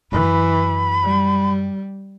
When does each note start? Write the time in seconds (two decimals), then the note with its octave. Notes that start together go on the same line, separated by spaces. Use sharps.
0.12 F#2 E3 B5
1.03 G3